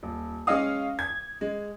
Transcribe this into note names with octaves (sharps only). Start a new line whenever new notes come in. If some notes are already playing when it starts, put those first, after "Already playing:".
D#1
G#3 C#4 D#5 F5 D#6
G#6
G#3